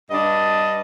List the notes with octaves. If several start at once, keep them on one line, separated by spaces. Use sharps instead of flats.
G2 D4 D#5